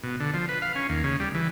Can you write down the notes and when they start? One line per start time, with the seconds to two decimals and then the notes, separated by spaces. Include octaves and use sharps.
0.03 B2
0.20 D3
0.34 F3
0.49 B4
0.62 F5
0.75 C#4
0.89 D#2
1.04 C#3
1.20 G3
1.34 E3